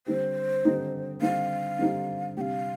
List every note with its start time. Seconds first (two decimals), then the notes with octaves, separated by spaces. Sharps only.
0.07 D3 G3 C4 D#4 G4 C5
0.64 D3 G3 C4 D#4 G4
1.22 D3 G3 C4 D#4 G4 F5
1.79 D3 G3 C4 D#4 G4
2.37 C3 G3 D4 G4 F5 G5